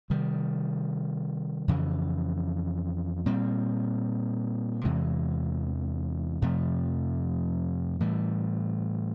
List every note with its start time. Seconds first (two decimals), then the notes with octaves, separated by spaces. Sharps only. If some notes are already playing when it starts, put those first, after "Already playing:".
0.10 C3 D#3 G3
1.68 F2 C#3 E3
3.26 A#2 G3 C4
4.84 E2 C3 E3 G#3
6.42 F2 C3 F3 A3
8.00 A2 E3 G3